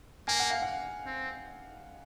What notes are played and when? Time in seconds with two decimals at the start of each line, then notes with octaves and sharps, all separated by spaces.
0.28 A#3 G#5
0.39 F#5
0.50 F5
0.62 F#5
1.06 C4